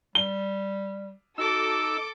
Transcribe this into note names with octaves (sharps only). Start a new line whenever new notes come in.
G3 G7
D#4 F#4 A4 D6 E6